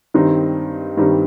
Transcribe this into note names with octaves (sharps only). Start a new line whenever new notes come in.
G2 D#3 G3 C4 D#4
G2 D#3 G3 C4 D#4